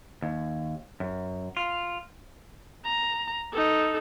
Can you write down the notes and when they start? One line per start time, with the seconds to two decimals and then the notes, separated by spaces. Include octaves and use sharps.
0.22 D#2
1.00 F#2
1.57 F4
2.85 A#5
3.52 D#4 A4